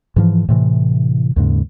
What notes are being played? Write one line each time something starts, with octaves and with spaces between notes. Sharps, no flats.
G#2 E3 F3
A2 C3 E3
D#2 G#2 C#3